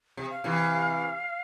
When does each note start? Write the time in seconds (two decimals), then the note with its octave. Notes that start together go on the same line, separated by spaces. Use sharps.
0.17 C3
0.31 F5
0.44 C3 E3